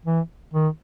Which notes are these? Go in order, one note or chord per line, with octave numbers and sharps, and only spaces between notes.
E3
D#3